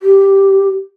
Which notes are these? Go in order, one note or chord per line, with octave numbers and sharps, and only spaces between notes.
G4